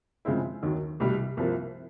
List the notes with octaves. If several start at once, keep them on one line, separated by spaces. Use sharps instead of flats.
C#3 F3 G#3 C4 E4
D#2 D#3 F#3
C2 B2 G3
C2 C3 F3 A#3